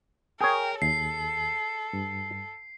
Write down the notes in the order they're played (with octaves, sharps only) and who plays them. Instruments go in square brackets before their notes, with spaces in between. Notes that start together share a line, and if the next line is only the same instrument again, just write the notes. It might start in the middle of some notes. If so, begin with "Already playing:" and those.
[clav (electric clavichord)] G#4 C#5 [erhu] A#4 [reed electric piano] G5
[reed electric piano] D#2 [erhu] A4 [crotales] C7
[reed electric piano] G2